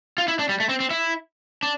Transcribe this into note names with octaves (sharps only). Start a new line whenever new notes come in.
F4
E4
D4
G3
A3
C4
C4
E4
D4